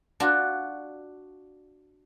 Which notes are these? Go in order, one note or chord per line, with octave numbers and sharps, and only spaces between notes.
D4 F4 F#4